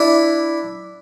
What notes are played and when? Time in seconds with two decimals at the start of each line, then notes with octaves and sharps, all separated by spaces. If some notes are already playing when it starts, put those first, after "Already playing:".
Already playing: D4 E4